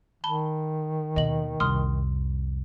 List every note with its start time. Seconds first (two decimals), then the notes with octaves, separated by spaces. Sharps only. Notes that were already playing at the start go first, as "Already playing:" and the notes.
0.24 D#3 A5 B5 G7
1.16 D#2 B2 D#5 F#7
1.60 C2 F2 C6 D#6 F6